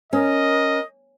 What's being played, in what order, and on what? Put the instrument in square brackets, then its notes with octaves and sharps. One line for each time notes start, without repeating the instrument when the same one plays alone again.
[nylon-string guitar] C#4 [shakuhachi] A#4 [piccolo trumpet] D#5